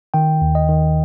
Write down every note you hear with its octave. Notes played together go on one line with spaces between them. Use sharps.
D#3 G5
D#2
D#5
D#3